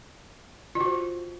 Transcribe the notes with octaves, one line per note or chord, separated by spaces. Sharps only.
F4
F#4
C5